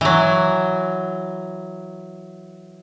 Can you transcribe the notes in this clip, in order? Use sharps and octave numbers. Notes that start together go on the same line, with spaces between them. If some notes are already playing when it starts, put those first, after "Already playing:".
E3 F#3